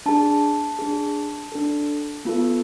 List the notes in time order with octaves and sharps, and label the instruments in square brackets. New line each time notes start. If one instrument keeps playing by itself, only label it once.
[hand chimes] D4 G#4 A5
D4 G#4
D4 A4
B3 F4 A4